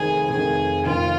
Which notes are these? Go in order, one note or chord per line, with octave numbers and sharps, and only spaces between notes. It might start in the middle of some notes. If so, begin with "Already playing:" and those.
Already playing: F1 F2 D#3 G#4
F1 F2 D#3 G#4
F1 F2 D#3 F4